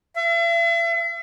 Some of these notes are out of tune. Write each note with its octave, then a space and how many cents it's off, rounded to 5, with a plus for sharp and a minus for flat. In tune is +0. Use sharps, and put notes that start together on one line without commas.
E5 +40